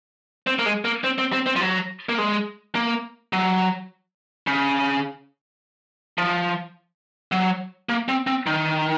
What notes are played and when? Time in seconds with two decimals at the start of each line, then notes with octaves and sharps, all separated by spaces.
0.47 C4
0.59 A#3
0.66 G#3
0.85 A#3
1.04 C4
1.18 C4
1.33 C4
1.46 C4
1.56 F3
1.60 F#3
2.09 A#3
2.18 G#3
2.75 A#3
3.33 F#3
4.47 C#3
6.18 F3
7.32 F#3
7.89 A#3
8.08 C4
8.27 C4
8.46 D#3